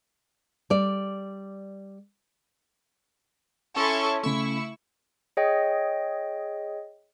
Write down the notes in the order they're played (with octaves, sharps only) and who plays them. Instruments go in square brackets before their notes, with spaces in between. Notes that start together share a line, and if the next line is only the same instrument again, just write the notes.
[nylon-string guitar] G3 D5
[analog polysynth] C#4 E4 [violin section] A4 C6 C#6
[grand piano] C#3 A3 [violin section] E4 [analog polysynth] C#6 E6
[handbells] G#4 C#5 D#5 G5